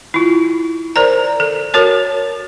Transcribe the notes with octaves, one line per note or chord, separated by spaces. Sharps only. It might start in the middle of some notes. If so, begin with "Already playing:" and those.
E4 F4
A#4 C5 D5 A#5
A4
F#4 A#4 C#5 A5